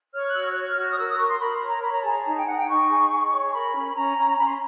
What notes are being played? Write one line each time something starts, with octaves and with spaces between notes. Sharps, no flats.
C#5 F6
F#6
F#4 E6
F6
C#5
F#4
D#6
A#4 E6
D#6
A#4 C#6
C6
A#4 B5
C#5
A#5
C#5 B5
A#5
G#4 A5
A#5
D#4 A5
G5
D#4 F#5
G5
D#4 C#6
G#4
G#4
C#5
A#4 B5
C#4
B5
C#4 A#5
C#4
C#4 B5
C6